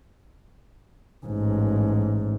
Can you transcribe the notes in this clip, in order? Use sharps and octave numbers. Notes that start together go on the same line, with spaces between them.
A1 G#2